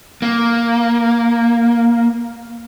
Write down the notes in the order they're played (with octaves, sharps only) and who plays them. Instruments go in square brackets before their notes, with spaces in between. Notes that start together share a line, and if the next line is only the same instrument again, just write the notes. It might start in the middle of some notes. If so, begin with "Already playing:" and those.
[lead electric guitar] A#3